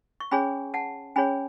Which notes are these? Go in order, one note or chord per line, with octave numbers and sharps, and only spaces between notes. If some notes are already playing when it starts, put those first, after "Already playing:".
C#6
C#4 G#4 C#5 G#5 B5
F#5 A5
C#4 G#4 C#5 G#5 B5